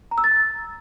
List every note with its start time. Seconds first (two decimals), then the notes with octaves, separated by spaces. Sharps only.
0.11 A#5
0.18 E6
0.24 A6